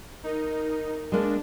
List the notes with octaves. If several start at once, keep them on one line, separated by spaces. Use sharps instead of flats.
D#4 A#4
G#3 A#3 D4